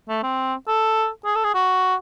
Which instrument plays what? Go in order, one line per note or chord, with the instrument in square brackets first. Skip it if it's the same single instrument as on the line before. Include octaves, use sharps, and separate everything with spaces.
[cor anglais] A3
C4
A4
G#4
A4
G#4
F#4